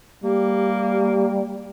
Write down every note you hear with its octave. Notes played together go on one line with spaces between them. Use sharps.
G3 A#3 G4